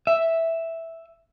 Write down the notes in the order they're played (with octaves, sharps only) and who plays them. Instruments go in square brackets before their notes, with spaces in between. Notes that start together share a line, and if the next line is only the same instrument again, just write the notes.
[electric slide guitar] E5